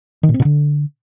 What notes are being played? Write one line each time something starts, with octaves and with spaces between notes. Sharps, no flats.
D#3
A#2
C4
B2
D3